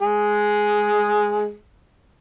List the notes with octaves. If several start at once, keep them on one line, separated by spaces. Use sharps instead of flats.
G#3 G#4